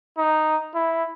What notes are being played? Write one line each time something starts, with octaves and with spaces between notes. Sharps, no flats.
D#4
E4